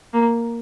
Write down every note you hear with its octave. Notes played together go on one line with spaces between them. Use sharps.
A#3